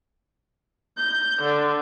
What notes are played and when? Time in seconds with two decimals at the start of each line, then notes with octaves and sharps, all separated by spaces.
0.96 G6
1.41 D3